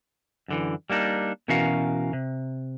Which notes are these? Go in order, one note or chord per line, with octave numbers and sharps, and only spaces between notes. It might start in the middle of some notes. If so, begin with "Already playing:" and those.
F#2 D3 E3
G3 A#3 D4 D#4
B2 E3 C#4 F#4 A#4 F5
C3